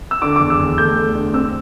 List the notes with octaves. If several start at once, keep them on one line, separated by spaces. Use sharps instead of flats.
E6
D3 D6
E2 D6
E6
E2
A3 G6
A3
D3
C4 E6